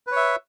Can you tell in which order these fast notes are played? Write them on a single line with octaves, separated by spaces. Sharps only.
B4 C#5 E5